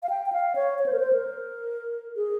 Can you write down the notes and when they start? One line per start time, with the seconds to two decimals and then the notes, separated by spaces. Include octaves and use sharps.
0.03 F5
0.09 G5
0.26 G5
0.33 F5
0.56 C#5
0.79 C#5
0.86 C5
0.93 A#4
1.00 C5
1.13 A#4
2.16 G#4